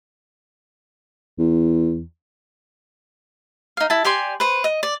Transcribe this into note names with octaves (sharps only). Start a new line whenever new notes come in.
E2
D#4 F5
E4 A5
G4 D5 G#5 C6
B4 C5
D#5
D5